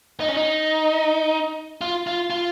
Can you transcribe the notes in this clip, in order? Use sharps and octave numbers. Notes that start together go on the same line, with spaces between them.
D#4
C#4
D#4
F4
F4
F4